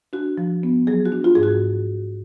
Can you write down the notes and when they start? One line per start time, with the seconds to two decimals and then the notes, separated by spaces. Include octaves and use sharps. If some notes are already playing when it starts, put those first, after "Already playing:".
0.13 D4 F#4
0.38 F3
0.63 B3
0.87 F#3 G#4
1.06 F#4
1.12 D4
1.24 F4
1.35 G#2 G#4
1.43 F#4